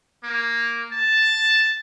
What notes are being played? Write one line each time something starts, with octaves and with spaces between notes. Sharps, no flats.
A#3
A5